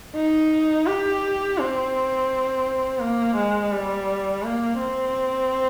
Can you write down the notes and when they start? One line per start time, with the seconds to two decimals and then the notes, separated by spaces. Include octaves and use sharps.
0.15 D#4
0.87 G4
1.59 C4
3.01 A#3
3.36 G#3
3.72 G3
4.43 A#3
4.79 C4